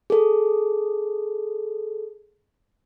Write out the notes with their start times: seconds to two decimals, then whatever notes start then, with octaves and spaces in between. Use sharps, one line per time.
0.10 G#4 A4